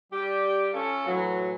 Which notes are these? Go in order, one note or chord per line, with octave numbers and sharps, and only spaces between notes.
G3 G4
C#4 F4 A4
A2 E3 F#3